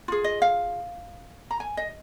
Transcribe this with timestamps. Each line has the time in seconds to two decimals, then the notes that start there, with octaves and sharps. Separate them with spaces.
0.08 F4 G#4
0.24 D#5
0.42 F5
1.51 A#5
1.60 G#5
1.77 D#5